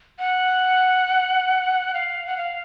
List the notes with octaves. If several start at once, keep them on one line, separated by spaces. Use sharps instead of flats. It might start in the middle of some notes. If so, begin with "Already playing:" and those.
F#5
F5
F#5
F5